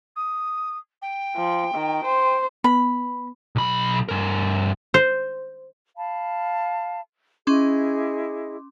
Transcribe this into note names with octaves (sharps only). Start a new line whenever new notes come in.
D#6
G5
F3
D#3
C5
B3 B5
B1 B5
G2 A#4
C5
F5 A5 B5
C#4 E4 G#4 D#5 C6 D6